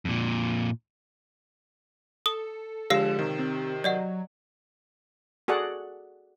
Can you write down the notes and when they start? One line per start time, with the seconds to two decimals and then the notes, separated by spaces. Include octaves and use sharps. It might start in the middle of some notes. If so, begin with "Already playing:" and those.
0.05 F2 A#2
2.26 A4 D#6 G7
2.90 D3 F3 G#3 G4 F5 E6 C7 E7
3.19 C3 D#3
3.39 C4
3.84 F#3 D5 D#5 F#5
5.48 F#4 G#4 A4 D5 F#5